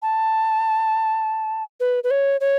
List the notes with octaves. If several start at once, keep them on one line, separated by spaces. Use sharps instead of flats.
A5
B4
B4
C#5
C#5